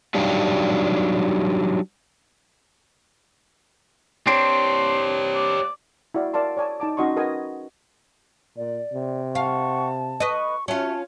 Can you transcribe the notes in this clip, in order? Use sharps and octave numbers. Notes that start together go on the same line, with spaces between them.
F#3 G3 D4 D#4 G4 F5
C4 D4 G4 C#5 C6
D5
E4 F#4 D5 F5
A#4 D5 F5 A5 C6
C#5 D5 G#5 A5
D#4 A5 D6
C#4 D#4 F#4 D#5 C6 C#6
F#4 A#4 B4 D#5 G5 G#5
A#2 D5
C3
F5 F#5 A5 C#6
B4 D#5 C#6
C#4 F4 F#4 E5 A5